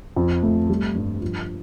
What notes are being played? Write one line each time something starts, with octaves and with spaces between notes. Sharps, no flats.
F2
A3
G3
G2
F3